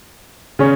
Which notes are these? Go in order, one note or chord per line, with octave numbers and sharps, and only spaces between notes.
C#3 C#4